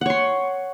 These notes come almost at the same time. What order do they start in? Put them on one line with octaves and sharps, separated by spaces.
F#5 C#5 C6